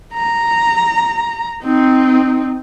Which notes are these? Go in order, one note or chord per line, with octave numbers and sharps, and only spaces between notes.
A#5
C4 D#4